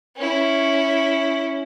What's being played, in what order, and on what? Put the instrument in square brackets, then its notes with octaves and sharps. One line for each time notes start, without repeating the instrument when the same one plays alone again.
[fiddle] C#4 E4